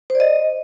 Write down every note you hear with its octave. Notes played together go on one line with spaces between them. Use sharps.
C5
D5
D#5